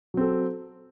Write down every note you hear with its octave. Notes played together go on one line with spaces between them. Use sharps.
F#3 C4 A4